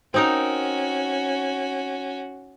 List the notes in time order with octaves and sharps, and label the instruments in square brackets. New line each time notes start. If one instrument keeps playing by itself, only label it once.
[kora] C4 D#4 A#4 [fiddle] C#4 F#4